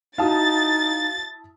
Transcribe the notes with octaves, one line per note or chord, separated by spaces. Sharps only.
D#4 E4 F#4 F5 A5 D#6 A6